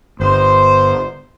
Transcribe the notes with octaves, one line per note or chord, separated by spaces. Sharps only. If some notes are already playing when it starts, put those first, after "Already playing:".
G1 C5